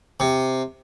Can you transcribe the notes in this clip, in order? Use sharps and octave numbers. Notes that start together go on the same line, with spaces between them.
C3